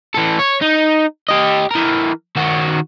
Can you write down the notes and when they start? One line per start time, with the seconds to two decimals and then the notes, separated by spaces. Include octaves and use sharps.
0.14 E3 A4
0.39 C#5
0.62 D#4
1.29 G4 D#5
1.71 E3 A#4
2.36 D#3 F#4